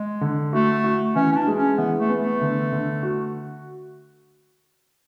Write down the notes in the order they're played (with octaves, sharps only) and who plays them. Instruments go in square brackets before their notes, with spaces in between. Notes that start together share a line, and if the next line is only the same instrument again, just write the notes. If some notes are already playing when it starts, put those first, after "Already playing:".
Already playing: [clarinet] G#3
[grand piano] D3
[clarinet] A3 [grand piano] F#4
[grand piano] F#4
[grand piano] E3 [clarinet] C#4
[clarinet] C#4
D4
[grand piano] G#3
[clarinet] C#4
[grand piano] E3 [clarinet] B3
[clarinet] A3
[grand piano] B3
[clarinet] A3
[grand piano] D3
D3
F#4